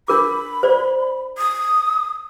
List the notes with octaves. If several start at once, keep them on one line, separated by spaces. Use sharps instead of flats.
D4 A#4 B5 D6
C5 D5
D#6